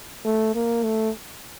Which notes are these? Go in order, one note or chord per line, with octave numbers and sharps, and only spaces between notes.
A3
A#3
A3